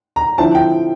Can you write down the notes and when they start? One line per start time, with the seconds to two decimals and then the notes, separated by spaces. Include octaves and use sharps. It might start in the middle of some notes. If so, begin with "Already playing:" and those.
0.16 A#5
0.38 D3 F3 C4 E4 A5
0.55 G5